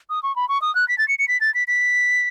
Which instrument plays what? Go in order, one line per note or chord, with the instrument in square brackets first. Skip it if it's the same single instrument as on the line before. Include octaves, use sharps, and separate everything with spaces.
[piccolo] D#6
C#6
B5
C#6
D#6
F#6
B6
A6
C#7
C#7
B6
A6
B6
B6